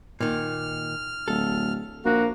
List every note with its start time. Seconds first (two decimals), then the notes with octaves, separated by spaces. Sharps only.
0.20 A#2 D#3 F6
1.28 D1 A4
2.05 A#1 A#3 F#4